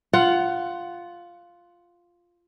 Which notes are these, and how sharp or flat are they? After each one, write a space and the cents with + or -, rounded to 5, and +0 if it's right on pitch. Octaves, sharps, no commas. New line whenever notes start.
F4 +0 F#5 +15